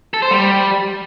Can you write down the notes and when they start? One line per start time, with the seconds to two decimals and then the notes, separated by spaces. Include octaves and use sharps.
0.14 A4
0.22 C5
0.31 G3